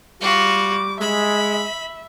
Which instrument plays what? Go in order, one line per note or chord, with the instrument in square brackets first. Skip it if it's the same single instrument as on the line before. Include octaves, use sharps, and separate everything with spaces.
[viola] G3 D6 [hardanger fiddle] F4 F#4
[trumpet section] G#3 [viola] E5 [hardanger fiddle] B5